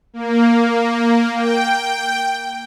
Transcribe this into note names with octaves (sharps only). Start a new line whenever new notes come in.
A#3
G5